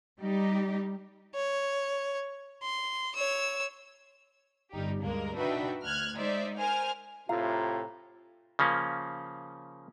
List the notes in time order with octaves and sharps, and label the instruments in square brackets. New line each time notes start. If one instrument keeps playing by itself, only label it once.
[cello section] G3 D#4 G4
[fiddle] C#5
C6
C#5 E6
[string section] G1 G3 D#4 G4
D2 G2 G#3 A#3 A#4
D4 D#4 F#4 B4 E5 G5
D2 F6 F#6 G#6
G#3 D#4 C5 D5 E5
A#4 C5 G#5 F6
[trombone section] A2 C3 [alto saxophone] F4 [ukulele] F5 [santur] A#5
[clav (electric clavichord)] C#3 F3 A#3 C#4